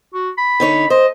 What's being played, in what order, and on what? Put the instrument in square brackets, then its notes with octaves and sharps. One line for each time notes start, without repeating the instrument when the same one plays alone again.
[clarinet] F#4
B5
[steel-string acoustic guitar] D3 D#4 C#5
[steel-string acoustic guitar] C5 [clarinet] D#5